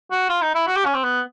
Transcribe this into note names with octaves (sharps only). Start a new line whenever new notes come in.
F#4
F4
D#4
E4
F#4
G4
C#4
C4
B3